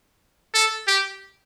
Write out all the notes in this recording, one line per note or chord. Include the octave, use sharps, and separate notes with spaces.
A4
G4